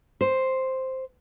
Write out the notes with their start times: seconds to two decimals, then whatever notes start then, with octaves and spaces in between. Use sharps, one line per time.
0.21 C5